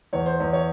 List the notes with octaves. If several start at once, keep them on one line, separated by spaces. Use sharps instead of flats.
E2 C#5
C5
E2 C#5
C#5